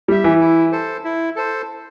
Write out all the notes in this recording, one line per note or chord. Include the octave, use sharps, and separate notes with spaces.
G3 G4 E5
E3
E4
A4 C5
E4
A4 C5